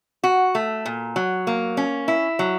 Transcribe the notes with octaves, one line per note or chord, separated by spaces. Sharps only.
F#4
A3
A#2
F#3
A#3
C#4
E4
F#3